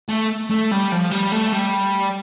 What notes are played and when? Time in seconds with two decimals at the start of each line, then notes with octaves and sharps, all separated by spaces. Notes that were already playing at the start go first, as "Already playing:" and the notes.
0.09 A3
0.50 A3
0.71 G3
0.92 F3
1.11 G3
1.32 A3
1.53 G3